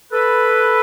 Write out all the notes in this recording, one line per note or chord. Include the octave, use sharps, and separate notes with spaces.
A4 B4